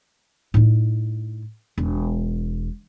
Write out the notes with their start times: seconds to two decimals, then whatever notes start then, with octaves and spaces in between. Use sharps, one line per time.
0.54 A2 D#4
1.78 E1